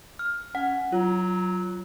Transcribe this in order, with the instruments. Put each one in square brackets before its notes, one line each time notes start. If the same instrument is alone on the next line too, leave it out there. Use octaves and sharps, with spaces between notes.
[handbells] F6
[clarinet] C#4 [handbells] F#5
[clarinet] F#3 [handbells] F4